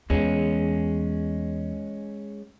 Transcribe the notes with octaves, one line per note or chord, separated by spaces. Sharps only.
E2 G#3 C#4